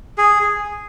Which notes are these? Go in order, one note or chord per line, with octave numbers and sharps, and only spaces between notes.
G#4